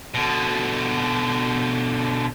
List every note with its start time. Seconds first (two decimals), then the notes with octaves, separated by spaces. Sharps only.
0.14 B2 D3